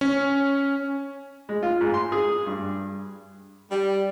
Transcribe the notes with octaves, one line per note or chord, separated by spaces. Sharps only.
C#4
G#3
F4
G#2
C6
G#4
G2
G3